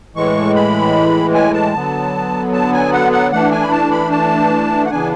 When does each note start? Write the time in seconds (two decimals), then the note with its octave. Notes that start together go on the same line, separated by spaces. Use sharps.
0.15 A2 E3 G#3 C#6
0.55 B5
1.34 G#5
1.54 A5
1.74 D3 F#3 B3
2.53 A5
2.73 G#5
2.93 F#5
3.12 F#5
3.32 E3 A3 D4 F#5
3.51 G#5
3.63 B5
3.72 A5
3.91 B5
4.11 A5
4.86 F#5
4.90 C#3 E3 B3 D4 G#5